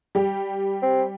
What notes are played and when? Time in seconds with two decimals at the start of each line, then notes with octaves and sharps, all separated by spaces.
0.15 G3 G4
0.82 C4